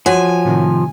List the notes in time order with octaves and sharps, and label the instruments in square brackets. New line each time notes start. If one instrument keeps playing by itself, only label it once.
[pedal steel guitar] F3 [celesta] F#4 C#5 F#5 [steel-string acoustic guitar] G#5
[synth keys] A2 C3 D#3